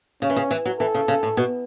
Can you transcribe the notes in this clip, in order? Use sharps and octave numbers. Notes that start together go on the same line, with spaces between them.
C#3 C#4
E3
C#3
E3
F#3
E3 A4
C#3
C#3
A2
B2